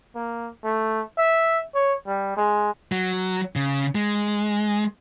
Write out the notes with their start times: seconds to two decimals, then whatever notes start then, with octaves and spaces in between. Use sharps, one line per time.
0.15 A#3
0.64 A3
1.18 E5
1.75 C#5
2.06 G3
2.37 G#3
2.92 F#3
3.56 C#3
3.95 G#3